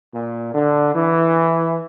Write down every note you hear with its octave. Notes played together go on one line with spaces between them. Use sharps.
A#2
D3
E3